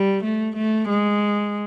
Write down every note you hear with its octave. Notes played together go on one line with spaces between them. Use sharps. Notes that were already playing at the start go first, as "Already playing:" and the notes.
Already playing: G3
A3
A3
G#3